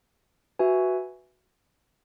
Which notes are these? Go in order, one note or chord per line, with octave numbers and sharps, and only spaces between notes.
F#4 B4 E5 G#5